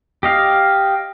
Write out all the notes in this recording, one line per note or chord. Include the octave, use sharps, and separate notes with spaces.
G4 D#5 F5